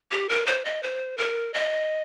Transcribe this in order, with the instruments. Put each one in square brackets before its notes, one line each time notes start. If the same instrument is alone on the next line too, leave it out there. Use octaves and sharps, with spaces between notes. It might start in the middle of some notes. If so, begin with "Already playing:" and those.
[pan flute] G4
A#4
C5
D#5
C5
A#4
D#5